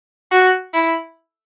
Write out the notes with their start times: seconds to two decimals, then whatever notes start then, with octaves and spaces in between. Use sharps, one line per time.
0.31 F#4
0.74 E4